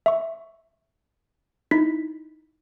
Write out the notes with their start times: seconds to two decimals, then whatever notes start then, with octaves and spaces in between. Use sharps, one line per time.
0.06 E5 C#6
1.71 D#4 E4 B6